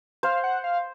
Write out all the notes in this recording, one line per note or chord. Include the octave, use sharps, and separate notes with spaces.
C5 F5
F#5
F5